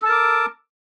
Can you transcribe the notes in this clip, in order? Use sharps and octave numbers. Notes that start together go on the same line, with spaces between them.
A4 A#4 A5 D6